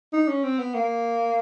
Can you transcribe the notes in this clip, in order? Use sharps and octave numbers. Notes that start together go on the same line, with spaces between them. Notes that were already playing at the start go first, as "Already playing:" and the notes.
D#4
C#4
C4
B3
A#3